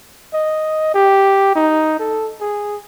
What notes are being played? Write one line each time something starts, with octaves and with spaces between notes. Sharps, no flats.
D#5
G4
D#4
A4
G#4